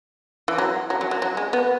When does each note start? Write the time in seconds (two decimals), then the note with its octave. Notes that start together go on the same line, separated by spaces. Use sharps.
0.48 E3
0.58 F#3
0.90 F#3
1.01 F#3
1.11 F#3
1.22 F#3
1.37 G#3
1.53 B3